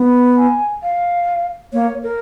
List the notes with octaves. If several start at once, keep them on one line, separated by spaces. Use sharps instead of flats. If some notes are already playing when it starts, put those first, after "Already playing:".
Already playing: B3
G#5
F5
A#3 C#5
A#4